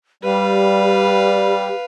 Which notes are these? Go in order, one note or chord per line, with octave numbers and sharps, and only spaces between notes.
G3 G4 B4 F5